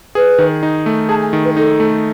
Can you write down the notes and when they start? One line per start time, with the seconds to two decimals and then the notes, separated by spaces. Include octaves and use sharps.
0.15 G#4 B4
0.38 D#3
0.63 D#4
0.86 A3
1.09 G#4 A5
1.21 G#5
1.33 D#3
1.44 B4
1.56 D#4 A4
1.80 A3